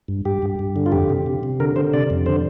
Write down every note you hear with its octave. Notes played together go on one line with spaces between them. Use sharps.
G2
G2 G4
G2
G2
D3
F4
F2 G4
C3
C3
C3
D3 A#4
D3 C5
C3 D5
F2
D3 C5